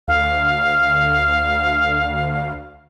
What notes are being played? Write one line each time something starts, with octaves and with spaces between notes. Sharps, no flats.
D2 F5